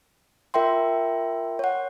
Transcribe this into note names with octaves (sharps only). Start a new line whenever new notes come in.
F4 A#4 E5 G5 C6
C#5 F#5